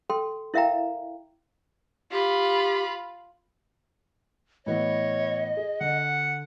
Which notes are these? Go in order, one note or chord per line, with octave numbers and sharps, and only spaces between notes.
A4 G5 C6
E4 A#4 E5 F5 G5 A#5
F4 G4 B5
A2 E3 B3 C#5 D#5
G#4
D3 F#5